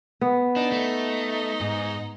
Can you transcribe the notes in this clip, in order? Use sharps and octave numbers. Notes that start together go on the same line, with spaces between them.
B3
D4 D#4
A3
G#2